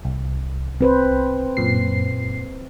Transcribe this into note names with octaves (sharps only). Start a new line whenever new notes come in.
C2
C4 B4 C5
F#2 A#2 C7